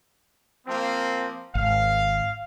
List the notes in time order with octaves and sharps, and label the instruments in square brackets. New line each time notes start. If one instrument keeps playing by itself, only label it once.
[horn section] F3 A#3 C4
[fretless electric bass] G#1 [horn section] F5